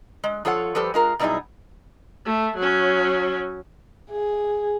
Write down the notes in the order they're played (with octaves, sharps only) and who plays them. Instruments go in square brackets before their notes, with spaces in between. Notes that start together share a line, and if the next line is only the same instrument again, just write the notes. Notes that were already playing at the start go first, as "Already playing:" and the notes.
[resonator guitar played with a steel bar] G#3
F3 F4 A4 C#5 F#5
F3 G3 G4 A4 B4 C5
G#3 F4 A#4
B2 F#3 G3 D#4 E4 G#4
[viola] A3
F#3 C#4
[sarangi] G#4